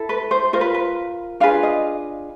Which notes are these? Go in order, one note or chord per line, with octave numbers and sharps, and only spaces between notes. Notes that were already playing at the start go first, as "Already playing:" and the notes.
Already playing: E4 A4
B4
C5
F4 A#4 C5
B4
B4
D4 F4 G#4 B4 F5
D#5